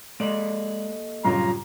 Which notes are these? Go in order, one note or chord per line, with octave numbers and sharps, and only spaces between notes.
G#3 A#3 A4 D5 D#5 D7
G2 A#2 C#3 F#3 F4 A#5